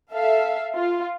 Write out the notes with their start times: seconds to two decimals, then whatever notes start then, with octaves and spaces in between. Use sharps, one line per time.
0.12 A4 E5 F5
0.75 F4